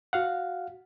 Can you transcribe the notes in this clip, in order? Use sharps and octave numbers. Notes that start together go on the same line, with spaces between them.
F#4 F5 F#5